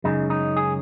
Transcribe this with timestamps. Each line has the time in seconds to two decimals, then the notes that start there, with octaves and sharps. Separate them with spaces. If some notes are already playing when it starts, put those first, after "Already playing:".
0.04 F#2 C#3 G#3 C#4 D#4
0.30 D#4
0.57 G#4